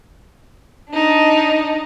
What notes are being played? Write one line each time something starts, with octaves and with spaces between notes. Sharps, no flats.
D4 D#4